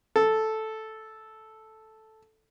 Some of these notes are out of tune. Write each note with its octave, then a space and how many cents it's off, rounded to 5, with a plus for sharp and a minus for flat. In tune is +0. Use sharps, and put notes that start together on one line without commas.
A4 -5